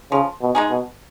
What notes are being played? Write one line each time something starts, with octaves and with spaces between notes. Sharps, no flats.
C#3 F3
B2
G#3 D#4 G#4
B2